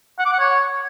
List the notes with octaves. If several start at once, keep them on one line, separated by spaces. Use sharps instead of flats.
F#5
D6
F#5
C#5